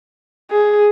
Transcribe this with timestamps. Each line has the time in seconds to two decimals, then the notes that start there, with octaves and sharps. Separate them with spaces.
0.51 G#4